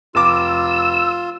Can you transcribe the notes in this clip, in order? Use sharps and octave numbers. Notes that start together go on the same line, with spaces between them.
F1 F4 D6 E6